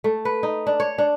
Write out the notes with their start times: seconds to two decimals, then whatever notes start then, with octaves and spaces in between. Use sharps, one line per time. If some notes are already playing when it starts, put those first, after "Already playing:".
0.04 A3
0.25 B4
0.43 D#4
0.67 D4
0.80 C#5
0.98 D4